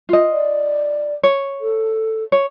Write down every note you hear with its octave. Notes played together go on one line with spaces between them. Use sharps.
F4 D#5
D5
C#5
A4
C#5